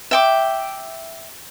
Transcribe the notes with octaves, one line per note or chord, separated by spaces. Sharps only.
E5 G5 D6